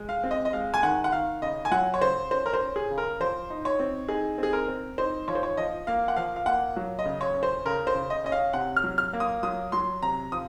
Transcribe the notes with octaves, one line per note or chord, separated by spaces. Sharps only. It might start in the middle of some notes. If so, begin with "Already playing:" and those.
Already playing: G#3
F5
C4
D#5
D#5
G#3 F5
G#5
D#3 F#5
F#5
D#3 F5
C#3 D#5
G#5
F#3 F#5
C#5
C#3 C5
C#4 C5
A#4
C5
C#4
G#4
C#3
A#4
F3 C5
D#4
C#5
C4
D#4 G#4
C4 G#4
A#4
C4
D#4 C5
F3 C#5
C5
C#5
F3 D#5
A#3 F5
F#5
F3 F5
F5
A#3 F#5
F#3
D#5
C#3
C#5
C#4
C5
C#3 A#4
C5
C#3
D#5
C#4 D#5
F5
C3 F#5
F6
F#3
F6
A#3
D#6
F#3 D#6
F#3 C6
C3 A#5
F3 D#6